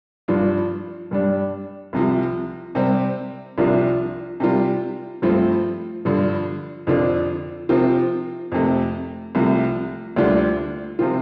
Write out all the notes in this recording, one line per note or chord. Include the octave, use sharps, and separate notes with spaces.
G2 F3 D4 F4
G2 G3 D4
C2 C3 F3
C3 G3 C4
C2 C3 F3 D4 F4
C3 G3 F4
G2 F3 A3 C4 F4
G2 D3 F3
F2 D3 F3 D4 F4
C3 F3 C4 F4
F2 C3 A3
C2 C3 F3 A3
D2 D3 G3 D4 F4
C3 F3 C4 F4